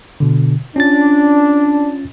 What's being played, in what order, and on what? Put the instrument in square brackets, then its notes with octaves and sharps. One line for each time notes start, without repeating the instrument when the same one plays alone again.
[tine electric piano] B2 D3
[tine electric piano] C#4 F4 A6 [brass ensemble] D4